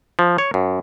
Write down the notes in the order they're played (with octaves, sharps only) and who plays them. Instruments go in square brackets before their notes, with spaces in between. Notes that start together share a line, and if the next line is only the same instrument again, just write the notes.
[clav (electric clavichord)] F3
C#5
F#2